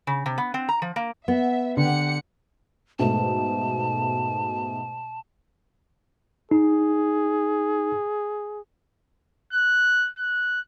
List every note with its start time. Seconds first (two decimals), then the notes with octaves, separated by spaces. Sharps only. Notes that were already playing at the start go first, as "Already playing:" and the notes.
0.07 C#3
0.26 C3
0.38 B3
0.54 C4
0.69 A#5
0.82 F3
0.96 A#3
1.28 B3 E5
1.77 D3 G4 F#5 C#7
2.99 G#2 B2 A3 A5
6.51 D#4 G#4
9.53 F#6
10.18 F#6